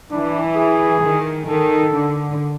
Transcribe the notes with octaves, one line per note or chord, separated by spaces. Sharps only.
E3 D4
G#4
D#3
D#3 A4
D3